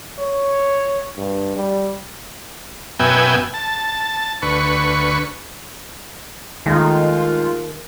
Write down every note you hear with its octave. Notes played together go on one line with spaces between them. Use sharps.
C#5
G2
G3
F#2 B2 B3 E5 G5 G#5
A5
D2 B4 C#6
D#2 D#3 G#3 A3 F4